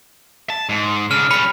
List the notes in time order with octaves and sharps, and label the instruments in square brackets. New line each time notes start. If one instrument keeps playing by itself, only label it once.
[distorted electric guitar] A5
G#2
[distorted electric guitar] C#3 D4 [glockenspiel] F6
[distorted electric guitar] G3 C#4 [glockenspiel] B5 C#7